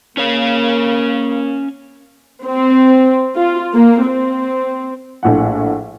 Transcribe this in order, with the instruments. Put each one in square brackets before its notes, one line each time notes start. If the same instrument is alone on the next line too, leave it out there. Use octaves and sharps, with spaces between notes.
[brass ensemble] A#3 [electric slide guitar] C#4 C#5 F5
[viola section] C4
F4
A#3
C4
[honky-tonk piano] A#1 A2 F#5